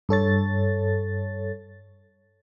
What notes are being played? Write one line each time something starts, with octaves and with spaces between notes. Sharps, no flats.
G2 A4 C#5 A6